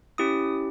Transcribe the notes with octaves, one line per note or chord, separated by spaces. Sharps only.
C#4 E4 G4 D#6